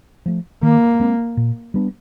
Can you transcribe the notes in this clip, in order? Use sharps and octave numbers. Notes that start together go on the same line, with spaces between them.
F3 A3
D#3 A#3
G#3 C4
A#2
G3 B3 D4